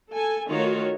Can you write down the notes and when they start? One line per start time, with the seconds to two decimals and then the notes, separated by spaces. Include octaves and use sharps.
0.12 A4 G#5
0.48 D#3 A3 F4 F#4 C#5